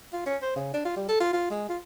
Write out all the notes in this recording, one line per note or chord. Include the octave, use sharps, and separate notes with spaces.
F4
C#4
C5
C#3
D4
F4
G3
A4
F4
F4
G#3
F4